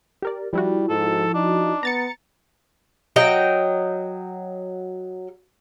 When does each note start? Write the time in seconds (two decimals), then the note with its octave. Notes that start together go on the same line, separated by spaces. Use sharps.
0.22 G4 A#4 D5
0.53 F3 G3 E4 F#4
0.90 G#2 A4
1.34 D4 D#4
1.83 B3 A#5 A6 C#7
3.16 F#3 D#5 G5